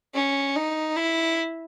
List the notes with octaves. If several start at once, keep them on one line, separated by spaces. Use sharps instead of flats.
C#4
D#4
E4